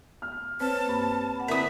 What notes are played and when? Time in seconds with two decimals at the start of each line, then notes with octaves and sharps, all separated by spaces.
0.22 F6
0.60 C4 B4 C#5 A5 F6
0.86 G2 A#3
1.36 F#5 B5
1.48 D3 C4 E4 A#4 B4 E5 D#6